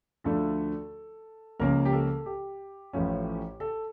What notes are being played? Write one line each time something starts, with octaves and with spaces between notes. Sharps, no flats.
D2 D3 F3 A3 D4 A4
C#2 C#3 F3 A#3 C#4 A#4
G4
A4
G4
A1 A2 F3 C#4
A4